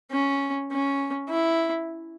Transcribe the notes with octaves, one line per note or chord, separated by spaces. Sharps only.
C#4
C#4
E4